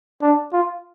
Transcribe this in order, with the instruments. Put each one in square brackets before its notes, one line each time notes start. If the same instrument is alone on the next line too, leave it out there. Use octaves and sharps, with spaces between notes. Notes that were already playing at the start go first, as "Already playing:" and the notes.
[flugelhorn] D4
F4